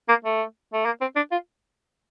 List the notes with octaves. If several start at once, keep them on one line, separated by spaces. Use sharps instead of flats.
A#3
A3
A3
A#3
C4
D4
F4